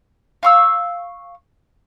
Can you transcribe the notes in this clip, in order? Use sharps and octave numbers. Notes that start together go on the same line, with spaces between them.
F5 C#6 E6